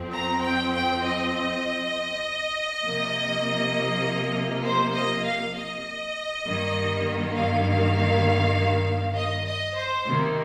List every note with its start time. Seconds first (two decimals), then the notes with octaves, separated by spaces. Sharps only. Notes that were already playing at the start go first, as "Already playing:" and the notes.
Already playing: F2 F3 C4
0.13 A#5
0.43 G5
0.73 G5
1.03 D#5
2.84 C3 F3 A#3
4.64 C5
4.94 D#5
5.25 F5
5.55 D#5
6.45 G2 D#3 A#3
7.35 F5
9.16 D#5
9.46 D#5
9.76 C5
10.06 C3 D#3 A#3